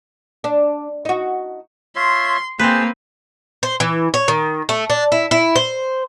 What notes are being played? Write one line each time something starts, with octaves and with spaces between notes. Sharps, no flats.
D4
D#4 F#4
F4 C#5 E5 C6
A#3 C4 G#4 B4 C5 A5
C5
E3
C#5
D#3
A3
D4
E4
E4
C5